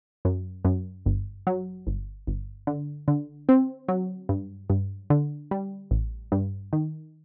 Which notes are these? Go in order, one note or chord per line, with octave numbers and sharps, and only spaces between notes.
F#2
F#2
G1
F#3
G1
G1
D3
D3
C4
F#3
G2
G2
D3
G3
A1
G2
D#3